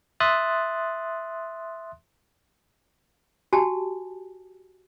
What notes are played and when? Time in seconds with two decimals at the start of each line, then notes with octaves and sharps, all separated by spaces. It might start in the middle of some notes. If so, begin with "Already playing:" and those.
0.20 E5 C6 D#6 F#6 A6
3.53 F#4 G4 G#5 A5